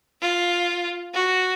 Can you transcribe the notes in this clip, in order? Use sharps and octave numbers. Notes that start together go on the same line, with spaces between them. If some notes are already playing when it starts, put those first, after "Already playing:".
F4
F#4